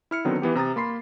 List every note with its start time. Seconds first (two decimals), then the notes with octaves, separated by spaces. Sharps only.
0.11 E4 F6 C#7
0.25 D3 D#3 F#3 B3 C4 D#4
0.42 E3 B3 G4
0.55 C3 A#5 D#6 A6
0.76 A#3 B5 C6 C7